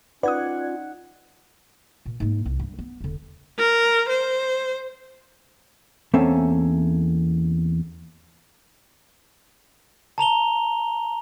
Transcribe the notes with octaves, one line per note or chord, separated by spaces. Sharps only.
C#4 D#4 F4 B4 D5 F#5 D#6 G#6
A#2
G#2 A#3
C2
G2
B3
E1 D3
A#4
C5
E2 A#3 C4 C#4 A4 E5
A5 A#5 F7 G7